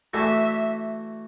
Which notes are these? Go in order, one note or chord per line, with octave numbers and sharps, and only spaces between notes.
E3 A3 D4 F#4 E5